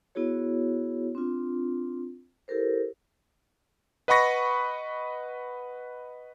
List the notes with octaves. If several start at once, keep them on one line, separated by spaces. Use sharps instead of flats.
B3 E4 F#4 G#4 C#5
C4 D4 F4
E4 G4 A4 A#4 C5
B4 D#5 F#5 B5 C#6 A#6